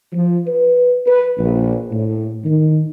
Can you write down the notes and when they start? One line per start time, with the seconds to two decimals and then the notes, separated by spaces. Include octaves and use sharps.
0.13 F3
0.46 B4
1.06 B4
1.38 A#1
1.91 A2
2.44 D#3